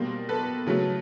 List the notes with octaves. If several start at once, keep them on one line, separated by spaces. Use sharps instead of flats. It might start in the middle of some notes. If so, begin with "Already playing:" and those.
Already playing: B2 G3 A#3 C5
A4 B4
C#3 F#3 A3